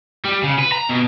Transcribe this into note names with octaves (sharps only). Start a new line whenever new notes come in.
G3
C#3
B4
A#5
B2